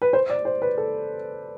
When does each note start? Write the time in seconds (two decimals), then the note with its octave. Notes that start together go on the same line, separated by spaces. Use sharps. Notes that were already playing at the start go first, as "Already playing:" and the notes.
0.02 B4
0.13 C5
0.30 D5
0.45 C5
0.62 B4
0.78 A4